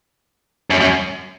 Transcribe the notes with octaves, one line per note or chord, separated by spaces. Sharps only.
F#2
F#2